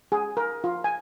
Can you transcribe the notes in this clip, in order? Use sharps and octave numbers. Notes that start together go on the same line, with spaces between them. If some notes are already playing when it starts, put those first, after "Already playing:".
G#4
A#4
F4
G#5